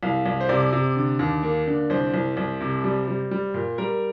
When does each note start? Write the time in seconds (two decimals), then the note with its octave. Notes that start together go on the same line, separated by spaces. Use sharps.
0.03 C2 F5
0.26 C2
0.40 C5
0.49 C3 D5
0.73 C3
0.96 D3
1.19 D#2
1.43 A#3
1.67 D3
1.90 C2 C5
2.14 C2
2.37 C2
2.61 C3
2.84 G3
3.08 G3
3.31 G3
3.54 A#2
3.78 G3 A#4